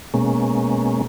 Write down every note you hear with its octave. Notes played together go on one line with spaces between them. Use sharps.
B2 G#3 A#3 C#4